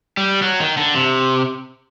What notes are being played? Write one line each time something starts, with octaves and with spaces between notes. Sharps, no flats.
G3
F#3
D#3
D3
C3